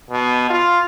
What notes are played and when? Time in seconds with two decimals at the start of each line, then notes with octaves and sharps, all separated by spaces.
0.11 B2
0.50 F4